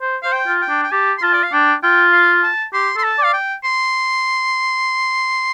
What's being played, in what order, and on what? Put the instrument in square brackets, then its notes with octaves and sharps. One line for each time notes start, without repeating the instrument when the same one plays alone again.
[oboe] C5
[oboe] C5 [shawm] F5
[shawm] G5
[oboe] F4
[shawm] G5
[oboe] D4
[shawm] G5
[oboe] G4 [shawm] A5
[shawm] C6
[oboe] F4 [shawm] A5
[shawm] D5
F5
[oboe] D4 [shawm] G5
[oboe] F4 [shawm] G5
[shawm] F5
A5
[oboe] G4 [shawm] C6
[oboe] A4 [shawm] C6
[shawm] A5
[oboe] D5
[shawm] F5
G5
C6